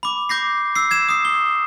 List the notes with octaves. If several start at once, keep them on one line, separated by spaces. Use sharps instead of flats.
B5 D6
D6 G6 A#6 C7
E6 C7
G#6 E7
D#6 C7
G7